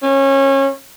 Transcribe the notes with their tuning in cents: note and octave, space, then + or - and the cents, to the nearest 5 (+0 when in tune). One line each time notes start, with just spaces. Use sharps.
C#4 -25